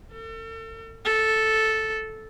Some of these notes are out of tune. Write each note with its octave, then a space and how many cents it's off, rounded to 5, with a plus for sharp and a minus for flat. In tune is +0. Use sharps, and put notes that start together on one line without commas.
A4 +40
A4 -5